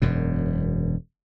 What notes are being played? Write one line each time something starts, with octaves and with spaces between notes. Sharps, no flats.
E1 F#2 B2